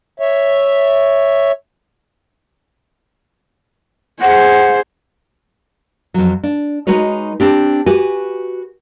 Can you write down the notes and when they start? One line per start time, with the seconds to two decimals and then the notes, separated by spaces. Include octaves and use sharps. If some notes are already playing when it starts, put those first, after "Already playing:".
0.20 C#5 E5
4.22 G#4 C5 F#5
6.14 F2 F#3
6.43 D4
6.87 G#3 D#4 F#4 B4 C#5
7.40 C4 D4 G4
7.86 F#4 G4 B4 G#5